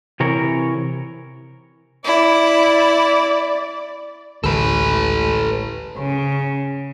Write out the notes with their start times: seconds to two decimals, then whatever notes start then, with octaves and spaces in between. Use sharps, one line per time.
0.20 C3 E3 A#4 C#5
2.05 E4 D5
4.44 A1 D2 G#3 A4 B4
5.97 C#3